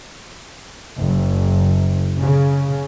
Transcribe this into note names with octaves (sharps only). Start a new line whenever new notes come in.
F#1
C#3